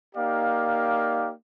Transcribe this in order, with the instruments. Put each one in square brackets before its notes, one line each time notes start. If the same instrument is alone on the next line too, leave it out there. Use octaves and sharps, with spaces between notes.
[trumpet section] A#3 D#4 G4 D5 F5